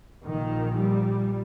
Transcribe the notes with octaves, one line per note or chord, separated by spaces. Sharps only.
A#1 A#2 D#3
G3